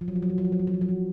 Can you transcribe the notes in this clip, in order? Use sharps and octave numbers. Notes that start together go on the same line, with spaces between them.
F3
F#3
F3
F#3
F3
F#3
F3
F#3
F3
F#3
F3
F#3
F3